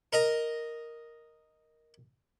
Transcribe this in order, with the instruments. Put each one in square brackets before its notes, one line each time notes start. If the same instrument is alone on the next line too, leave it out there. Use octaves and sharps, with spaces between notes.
[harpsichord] A#4 D#5 A#5